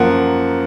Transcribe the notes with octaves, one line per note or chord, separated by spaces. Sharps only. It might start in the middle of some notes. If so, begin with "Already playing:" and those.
Already playing: F#2 F3 A#3 F#5